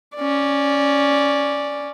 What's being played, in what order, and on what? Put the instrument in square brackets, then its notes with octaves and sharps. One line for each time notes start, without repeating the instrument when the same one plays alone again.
[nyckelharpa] C#4 D5